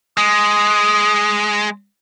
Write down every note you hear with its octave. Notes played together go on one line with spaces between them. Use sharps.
G#3 D#6